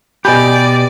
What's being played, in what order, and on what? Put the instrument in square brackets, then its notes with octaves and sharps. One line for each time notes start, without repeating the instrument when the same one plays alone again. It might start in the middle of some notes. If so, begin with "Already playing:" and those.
[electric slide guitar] B2 G4 [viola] D5 [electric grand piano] D#5 G#5 B5